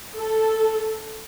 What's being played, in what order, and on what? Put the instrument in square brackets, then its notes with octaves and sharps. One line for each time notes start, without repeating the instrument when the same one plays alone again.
[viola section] A4